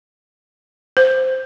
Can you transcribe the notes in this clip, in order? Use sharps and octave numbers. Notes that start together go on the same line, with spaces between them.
C5